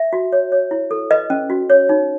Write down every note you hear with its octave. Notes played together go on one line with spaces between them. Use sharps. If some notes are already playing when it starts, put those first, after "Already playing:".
Already playing: E5
F#4
C#5
C#5
E4
A4
B4 D#5
C#4
F#4
C#5
D#4